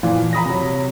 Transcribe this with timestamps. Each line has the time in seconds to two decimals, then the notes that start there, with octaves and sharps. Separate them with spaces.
0.03 A#2 E3 F3
0.33 A#5 B5 D#6 A#6
0.45 C3 F#3